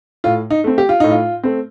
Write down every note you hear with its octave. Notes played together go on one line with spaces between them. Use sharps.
A2 F4
D#4
A3 C4
G4
F4
A2 D#4
F4
A3 C4